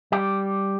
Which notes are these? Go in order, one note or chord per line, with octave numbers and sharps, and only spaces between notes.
G3 G4